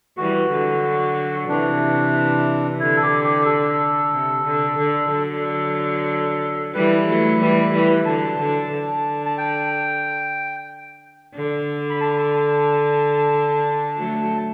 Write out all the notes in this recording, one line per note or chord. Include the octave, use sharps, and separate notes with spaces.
E3 G3 F#4
D3 F#3
C3 E3 D4
D3 E4
A4
G4
G4
A4
C3
D3
D3
D3 F#3
A4
E3 G3 B4
F#3 A3
E3 G3
E3 G3
D3 F#3 A5
D3
D3
A5
G5
D3
B5
A5
F#3 A3